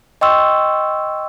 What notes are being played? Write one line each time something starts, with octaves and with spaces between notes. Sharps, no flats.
D#5 G5 C6 C#6 E6